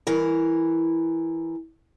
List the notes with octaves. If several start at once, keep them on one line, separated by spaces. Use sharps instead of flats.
E3 A#4